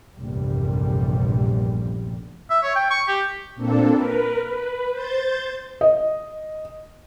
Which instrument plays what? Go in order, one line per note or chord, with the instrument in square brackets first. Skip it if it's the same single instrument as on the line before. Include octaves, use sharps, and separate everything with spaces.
[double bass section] F1 A#1 E2 G2 A#2 G3
[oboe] E5
C#5
G5
C#6
G4
[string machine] A#2 A#3 C4 D4 A4
A#4 B4
B4
C5 G6 A6
[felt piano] D#5